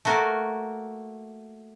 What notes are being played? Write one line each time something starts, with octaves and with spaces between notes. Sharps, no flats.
A3 A#3 F#4 A#4